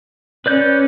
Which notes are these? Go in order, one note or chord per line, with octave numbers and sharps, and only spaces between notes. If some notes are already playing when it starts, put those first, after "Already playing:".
C#4 B4 D5 G6